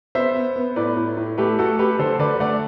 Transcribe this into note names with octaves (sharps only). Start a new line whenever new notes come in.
B3 C5 E5
B3
B3
A2 B4 D5
A2
A2
A3 G4 B4
A3 F#4 A4
A3 G4 B4
D3 A4 C5
D3 B4 D5
A3 D5 F#5